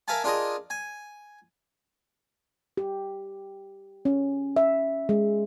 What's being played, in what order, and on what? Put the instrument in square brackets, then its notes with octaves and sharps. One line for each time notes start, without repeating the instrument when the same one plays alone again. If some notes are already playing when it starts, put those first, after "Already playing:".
[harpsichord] A#4 E5 F5 G#5 A5
D4 F4 G#4 A#4 D#5
G#5
[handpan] G4
C#4
E5
G#3